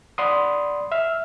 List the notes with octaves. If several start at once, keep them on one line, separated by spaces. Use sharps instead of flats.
D5 F#5 B5 C6 D#6
E5 F6